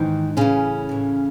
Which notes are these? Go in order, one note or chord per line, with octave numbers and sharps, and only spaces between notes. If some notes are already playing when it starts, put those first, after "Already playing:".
Already playing: G#2 D#3 E3 D#4
A2 C#3 E3 C#4
A2 E3